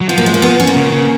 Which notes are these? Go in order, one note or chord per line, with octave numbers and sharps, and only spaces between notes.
F#3
F3 B3
A#3
G#3
A#3
B3
C#4
A#3
C#3
C#3